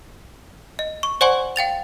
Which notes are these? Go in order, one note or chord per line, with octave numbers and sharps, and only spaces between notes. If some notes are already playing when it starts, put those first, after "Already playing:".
D#5
C#6
C5 D5 F#5 G#5 C6 C#6
F5 G5 A6 F7